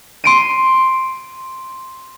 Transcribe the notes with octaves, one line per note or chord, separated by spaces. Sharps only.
C6 D7 D#7